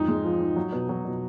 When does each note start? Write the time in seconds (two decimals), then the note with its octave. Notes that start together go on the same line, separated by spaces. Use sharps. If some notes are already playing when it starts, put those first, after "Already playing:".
Already playing: F2 G#2 D#4
0.08 G#3
0.25 F3
0.40 G#2
0.56 F#3
0.72 B2
0.89 F#3
1.05 B2